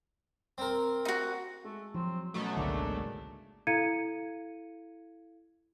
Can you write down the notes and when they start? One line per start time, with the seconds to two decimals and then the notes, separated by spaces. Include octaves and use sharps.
0.58 C4 A#4
1.05 D#4 F#4
1.64 G#3 A3
1.94 F3 F#3 C4
2.34 B2 F#3 A3 B3 C#4 F#4
2.57 G#1 C#2 D3 G#3 A#3 D4 D#4
3.67 E4 A4 F5 G#6 C#7 D#7